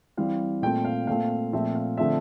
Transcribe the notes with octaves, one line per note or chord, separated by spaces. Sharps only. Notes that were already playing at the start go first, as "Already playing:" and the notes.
E3 G3 C4 F5
A#2 A3 C4 G5
F5
A#2 A3 C4 F5
A#2 F3 A3 C4 E5
F5
D3 F3 A3 C4 E5